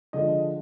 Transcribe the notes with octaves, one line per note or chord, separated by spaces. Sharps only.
D3 F3 G#3 D#5